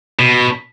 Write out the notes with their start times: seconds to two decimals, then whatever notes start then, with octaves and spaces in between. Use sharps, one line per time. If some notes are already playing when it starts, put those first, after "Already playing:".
0.19 B2